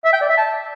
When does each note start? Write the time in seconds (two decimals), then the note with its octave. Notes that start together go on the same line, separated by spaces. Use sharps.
0.05 E5
0.13 G5
0.21 D5
0.29 E5
0.37 A5